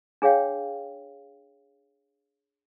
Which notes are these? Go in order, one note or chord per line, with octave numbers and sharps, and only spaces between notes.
D4 G#4 C#5 F5 G5